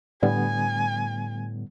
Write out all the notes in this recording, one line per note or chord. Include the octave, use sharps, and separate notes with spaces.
A2 D3 G3 B3 G#5